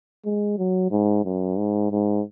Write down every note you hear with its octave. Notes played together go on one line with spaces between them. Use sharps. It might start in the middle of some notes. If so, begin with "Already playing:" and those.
G#3
F#3
G#2
F#2
G#2
G#2